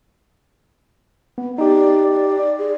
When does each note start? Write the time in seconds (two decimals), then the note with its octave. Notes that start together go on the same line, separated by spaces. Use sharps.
1.38 B3
1.58 D#4 G4 D5
2.12 D5
2.59 G#4